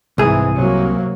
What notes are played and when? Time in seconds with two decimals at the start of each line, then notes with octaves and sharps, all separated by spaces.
0.18 C2 G#2 E3 G#4
0.55 C3 F#3 A#3